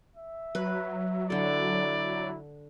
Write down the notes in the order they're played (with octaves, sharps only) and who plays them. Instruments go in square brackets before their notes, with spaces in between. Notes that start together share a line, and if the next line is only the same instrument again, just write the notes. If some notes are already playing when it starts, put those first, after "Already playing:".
[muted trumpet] E5
[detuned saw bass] F#3 [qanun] B4
[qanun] D3 A4 [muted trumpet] E4 [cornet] D5